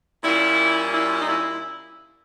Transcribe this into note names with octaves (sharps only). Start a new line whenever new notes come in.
A#2 G3 A#3 C#4 E4
E4
D#4
E4